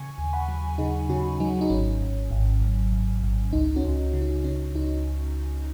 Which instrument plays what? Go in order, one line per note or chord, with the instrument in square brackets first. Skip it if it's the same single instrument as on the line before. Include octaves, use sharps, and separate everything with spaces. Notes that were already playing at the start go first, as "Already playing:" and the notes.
Already playing: [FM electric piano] C#3 G#5 C#6
D#2
F#5 B5
F#3
C#3 D#4 G#4
C#3 C#4 F#4
F#3 D#4
D#4
G#1 C#4
G#1
G#1
G#1
G#1
G#1
C#2 D#4
C#4 F#4
C#2
C#3
D#4
C#3 C#4
C#2 D#4